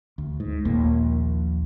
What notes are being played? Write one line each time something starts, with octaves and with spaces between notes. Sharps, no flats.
D2
G#2
A#1 D#2 A#3